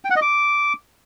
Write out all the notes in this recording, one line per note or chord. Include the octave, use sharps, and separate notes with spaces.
G5
F#5
D#5
D6